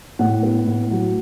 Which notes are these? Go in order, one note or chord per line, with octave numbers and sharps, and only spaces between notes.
A2 F#5
B3
A2
F#3